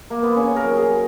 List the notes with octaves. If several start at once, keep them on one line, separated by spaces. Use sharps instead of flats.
A#3
B3
C#3 C#4
A#4
F#3
G#4
F#3